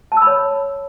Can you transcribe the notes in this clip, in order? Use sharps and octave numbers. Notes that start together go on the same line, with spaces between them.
A5
E6
B5
C#5